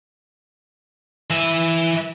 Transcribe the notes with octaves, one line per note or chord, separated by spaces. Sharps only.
E3 E5